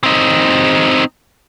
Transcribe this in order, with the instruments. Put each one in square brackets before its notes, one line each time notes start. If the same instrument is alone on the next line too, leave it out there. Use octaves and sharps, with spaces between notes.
[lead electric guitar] C4 D#4